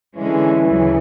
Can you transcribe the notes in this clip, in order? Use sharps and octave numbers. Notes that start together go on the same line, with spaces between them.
D3 E3 G#3 C#4
D2 C#3 F#3